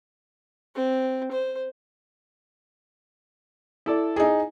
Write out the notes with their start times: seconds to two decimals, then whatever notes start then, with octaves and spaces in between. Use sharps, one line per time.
0.75 C4
1.31 C5
3.86 E4 A4 D5
4.16 D#4 G#4